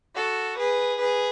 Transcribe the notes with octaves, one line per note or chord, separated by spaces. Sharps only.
F#4 A4
G#4 B4
G#4 B4